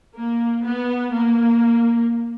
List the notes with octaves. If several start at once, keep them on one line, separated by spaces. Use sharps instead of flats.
A#3
B3
A#3